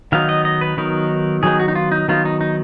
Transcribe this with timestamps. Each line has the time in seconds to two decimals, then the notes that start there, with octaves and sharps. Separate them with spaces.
0.12 D#3 F#3 B3 D#4 F5
0.29 D#5
0.45 D#5
0.61 B4
0.77 D#3 F#3 B3 D#4 A#4
1.43 D#3 F#3 B3 D#4 G#4
1.59 F#4
1.68 D#4
1.75 F4
1.92 D#4
2.08 D#3 F#3 B3 D#4 F4
2.25 D#4
2.41 D#4